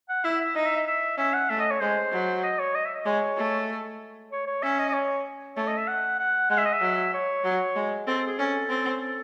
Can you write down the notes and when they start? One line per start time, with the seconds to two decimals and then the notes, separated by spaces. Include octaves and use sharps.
0.09 F#5
0.24 E4 E5
0.40 E5
0.55 D#4 D#5
0.66 E5
0.77 E5
0.87 E5
1.18 C#4 E5
1.34 F#5
1.50 A3 E5
1.60 D#5
1.71 C#5
1.81 G#3 C5
2.12 F#3
2.43 D#5
2.59 C#5
2.75 D#5
2.85 E5
2.95 D#5
3.06 G#3 C#5
3.37 A3
4.32 C#5
4.47 C#5
4.62 C#4 E5
4.79 D#5
4.89 D#5
4.93 C#5
5.56 A3 C#5
5.67 D#5
5.77 E5
5.88 F#5
6.19 F#5
6.50 G#3 F#5
6.58 E5
6.65 D#5
6.73 E5
6.81 F#3
7.13 C#5
7.44 F#3
7.76 G#3
8.07 C4 A4
8.18 A4
8.27 G#4
8.39 C#4 A4
8.69 C4
9.01 A4